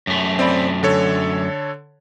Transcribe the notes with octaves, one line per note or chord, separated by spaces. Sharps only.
F#2 A3
C4 D5 B5
D3 A4 C#5